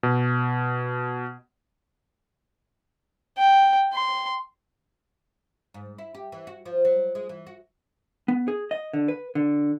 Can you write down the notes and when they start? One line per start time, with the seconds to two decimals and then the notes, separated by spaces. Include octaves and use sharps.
0.03 B2
3.38 G5
3.93 C6
5.74 G#2
5.98 E4
6.15 G4
6.32 E3
6.47 F#4
6.65 F3
6.85 F#3
7.15 G#3
7.29 E3
7.47 F#4
8.28 B3
8.48 G#4
8.71 D#5
8.93 D3
9.08 B4
9.35 D3